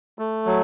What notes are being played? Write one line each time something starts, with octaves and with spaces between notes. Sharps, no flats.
A3
F#3